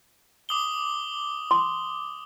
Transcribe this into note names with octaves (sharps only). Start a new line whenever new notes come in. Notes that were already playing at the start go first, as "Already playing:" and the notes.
D6 D#6 G7
C6